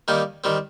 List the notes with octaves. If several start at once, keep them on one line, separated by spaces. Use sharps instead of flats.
D#3 G3 A#3 D#4
D#3 G3 C4